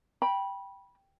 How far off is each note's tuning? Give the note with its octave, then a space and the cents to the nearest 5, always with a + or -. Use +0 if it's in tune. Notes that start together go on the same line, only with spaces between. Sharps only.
G5 +0 B5 -20